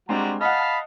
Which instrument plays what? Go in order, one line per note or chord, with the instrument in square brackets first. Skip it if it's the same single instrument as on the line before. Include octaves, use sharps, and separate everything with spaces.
[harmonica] G3 F#4 A#5 [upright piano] G#3 C4 D4
[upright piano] D#5 F#5 [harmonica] F5 A5 F6 [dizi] B5